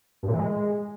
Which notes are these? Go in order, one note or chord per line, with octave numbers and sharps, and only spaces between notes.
G2
A#2
E3
G#3